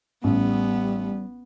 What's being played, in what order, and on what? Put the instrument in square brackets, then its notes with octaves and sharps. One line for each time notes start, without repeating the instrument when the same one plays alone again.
[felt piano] A1 [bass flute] G3 [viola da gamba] B3